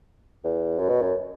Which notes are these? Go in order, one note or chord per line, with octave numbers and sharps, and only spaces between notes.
E2
F#2
B2
F#2